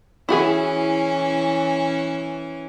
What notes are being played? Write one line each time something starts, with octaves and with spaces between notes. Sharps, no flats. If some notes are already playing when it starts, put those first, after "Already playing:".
E3 C#4 E4 F#4 G#4